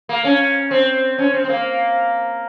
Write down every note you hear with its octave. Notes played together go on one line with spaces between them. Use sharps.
A#3
C#4
C4
C#4
C4
C4
A#3